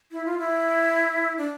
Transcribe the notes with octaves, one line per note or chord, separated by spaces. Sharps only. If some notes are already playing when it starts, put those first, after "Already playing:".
E4
F4
E4
D4